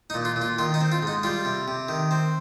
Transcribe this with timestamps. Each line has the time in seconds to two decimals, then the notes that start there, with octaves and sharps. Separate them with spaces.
0.10 D#4
0.14 A#2
0.25 F4
0.36 A#2
0.42 F4
0.58 D#3 F4
0.74 D#4
0.81 C4
0.92 F4
1.03 G#2 D#4
1.23 G3 F4
1.45 C3
1.68 C3
1.89 D#3
2.11 C4